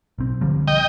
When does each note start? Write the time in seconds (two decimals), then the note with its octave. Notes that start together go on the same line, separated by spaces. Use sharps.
0.18 B1 C4
0.41 D3 F3 G3
0.68 D#5 G5